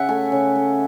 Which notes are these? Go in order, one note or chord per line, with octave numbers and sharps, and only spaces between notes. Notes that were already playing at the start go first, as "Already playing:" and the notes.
Already playing: C#3 C#4 E5 F#5
A3 G#5
C#3
A3